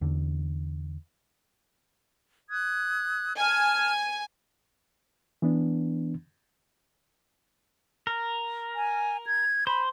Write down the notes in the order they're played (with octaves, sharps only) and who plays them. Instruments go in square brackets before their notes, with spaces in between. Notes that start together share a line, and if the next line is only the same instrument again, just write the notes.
[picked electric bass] E2 D3
[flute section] D#6 F#6 G#6
[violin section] G#5 [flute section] A5 F6
[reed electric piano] E3 B3 D4
[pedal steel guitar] A#4
[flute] G#5
G#6
[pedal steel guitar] C5 [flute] B5